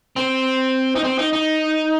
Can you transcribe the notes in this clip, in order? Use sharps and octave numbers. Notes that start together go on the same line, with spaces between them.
C4
D#4
C4
D#4
D#4